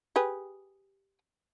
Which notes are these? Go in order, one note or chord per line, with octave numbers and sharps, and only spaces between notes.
G4 G#4 B4